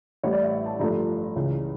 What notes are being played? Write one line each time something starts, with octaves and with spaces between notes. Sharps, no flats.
A1 A2 G3 C#5
D5
E5
A5
G1 G2 F3 A3 A#5
C#2 C#3 E3